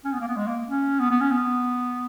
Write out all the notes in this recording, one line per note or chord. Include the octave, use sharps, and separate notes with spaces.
C#4
B3
A#3
B3
G#3
A#3
C#4
B3
B3
C#4
B3